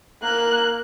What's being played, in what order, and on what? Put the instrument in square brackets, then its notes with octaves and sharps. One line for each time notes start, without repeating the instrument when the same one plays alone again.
[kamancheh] A#3 F#6